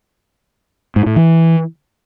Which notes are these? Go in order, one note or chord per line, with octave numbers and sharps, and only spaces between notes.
G#2
A2
E3